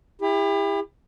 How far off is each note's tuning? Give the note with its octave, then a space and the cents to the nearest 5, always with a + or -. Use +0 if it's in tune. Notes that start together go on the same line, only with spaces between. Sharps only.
E4 +0 G4 +40